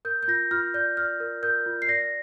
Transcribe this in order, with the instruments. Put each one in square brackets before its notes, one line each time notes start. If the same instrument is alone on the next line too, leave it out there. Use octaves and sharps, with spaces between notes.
[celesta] A#4 G6
G6
F4 A#6
F4 F6
D5 G6
D5 F6
A#4
A#4 G6
F4
C7
D5 A#6